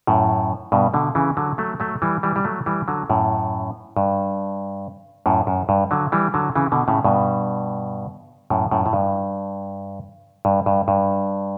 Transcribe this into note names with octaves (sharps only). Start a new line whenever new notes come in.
F#2 A2
G2 B2
B2 D3
C#3 E3
D3 F#3
F#3 A3
F#3 A3
E3 G3
E3 G3
G3
F#3 A3
E3 G3
D3 F#3
F#2 A2
G2
F#2 A2
F#2
G2
D3 F#3
E3 G3
D3 F#3
C#3 E3
B2 D3
A2 C#3
G2 B2
F#2 A2
F#2 A2
A2
G2
G2
G2
G2